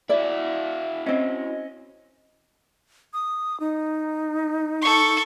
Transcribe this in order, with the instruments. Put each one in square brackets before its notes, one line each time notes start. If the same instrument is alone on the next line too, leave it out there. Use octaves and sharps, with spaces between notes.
[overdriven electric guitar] E4 F#4 [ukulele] D5 [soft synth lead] E5
[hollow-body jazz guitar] C4 C#4 [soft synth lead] D#5
[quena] D#6
D#4
[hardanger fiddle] A4 C#6